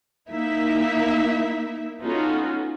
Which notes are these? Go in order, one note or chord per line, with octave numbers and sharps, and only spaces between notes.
A#3 D#4 E4 E5
B3 C#4 D#4 F4 F#4 A4